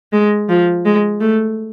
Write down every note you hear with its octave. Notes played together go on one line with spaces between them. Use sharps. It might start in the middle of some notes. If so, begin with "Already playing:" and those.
G#3
F3
G#3
A3